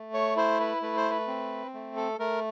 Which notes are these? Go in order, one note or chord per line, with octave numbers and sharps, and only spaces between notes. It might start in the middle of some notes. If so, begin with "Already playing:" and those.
Already playing: A3
C#5
E4 C5
B4
A3 B4
C5
B4
C4
A3
A4
A3 A#4